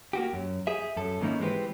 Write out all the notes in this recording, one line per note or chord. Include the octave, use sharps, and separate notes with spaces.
A#3 F#4 G4
F#2
G4 G#4 E5
F#2 A4
G#2 D#3 A#3 C#4 D#4 E4
E3 G#3 C4 D4 G4 B4